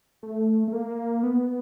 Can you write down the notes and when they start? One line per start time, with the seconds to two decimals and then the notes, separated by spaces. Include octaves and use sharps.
0.23 A3
0.68 A3
0.73 A#3
1.23 B3